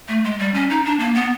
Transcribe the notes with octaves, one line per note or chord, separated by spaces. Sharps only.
A3
G#3
G3
C#4
D#4
D4
A#3
B3